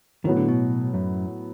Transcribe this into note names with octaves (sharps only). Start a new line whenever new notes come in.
A2 D#3 F#3 B3
D3
B2
F#2